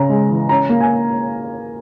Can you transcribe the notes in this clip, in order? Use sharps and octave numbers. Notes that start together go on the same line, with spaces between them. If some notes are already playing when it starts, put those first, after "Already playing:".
Already playing: C#3 C#4 A#5
G#3
E3
C#4 A#5
A#3
G#5